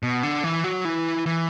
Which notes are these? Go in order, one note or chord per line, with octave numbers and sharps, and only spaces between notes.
B2
D3
E3
F#3
E3
E3